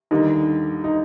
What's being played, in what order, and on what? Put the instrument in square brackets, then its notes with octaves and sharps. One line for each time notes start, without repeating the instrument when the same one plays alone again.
[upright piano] D#2 D3 G3 D#4
D#4